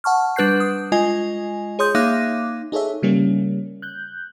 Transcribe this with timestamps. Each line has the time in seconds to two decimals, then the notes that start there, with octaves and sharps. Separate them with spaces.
0.04 F#5 A5 C#6 F6
0.36 G3 D4 B4 F#6 G6 C7
0.60 D#6
0.92 G#3 F4 D#5 G#5
1.79 G#4 C#5 C6 D#6 G6
1.95 A#3 D#4 E5 F5 D6 F#6
2.72 D#4 G#4 A4 C#5 E5
3.03 C#3 G3 A#3 C#4
3.82 F#6 G6